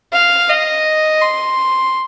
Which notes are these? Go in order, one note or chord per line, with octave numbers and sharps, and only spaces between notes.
F5
D#5
C6